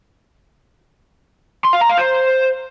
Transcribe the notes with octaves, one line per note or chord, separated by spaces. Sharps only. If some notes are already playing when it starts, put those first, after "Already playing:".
C6
F5
A#5
F5
C5